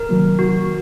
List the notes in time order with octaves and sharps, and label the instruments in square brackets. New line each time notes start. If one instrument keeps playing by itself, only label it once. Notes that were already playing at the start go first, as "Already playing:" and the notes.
Already playing: [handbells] A#4
[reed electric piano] C3 D#3 F#3 A#3
[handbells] F#4